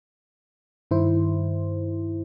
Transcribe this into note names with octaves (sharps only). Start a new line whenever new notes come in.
G2 D#3 E4 C5